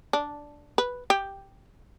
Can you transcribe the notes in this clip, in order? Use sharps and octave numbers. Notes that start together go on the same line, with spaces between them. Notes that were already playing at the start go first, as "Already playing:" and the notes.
D4
B4
G4